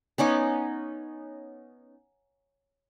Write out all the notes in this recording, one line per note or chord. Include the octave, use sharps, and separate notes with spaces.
B3 C#4 D#4 D6